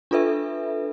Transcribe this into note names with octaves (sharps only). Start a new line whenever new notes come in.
D4 F4 A4 B4 E5